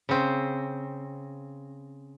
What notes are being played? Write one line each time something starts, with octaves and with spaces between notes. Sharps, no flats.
C#3 C4